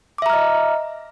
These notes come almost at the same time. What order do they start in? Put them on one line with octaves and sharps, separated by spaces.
D6 E5 A#5 F6 D#5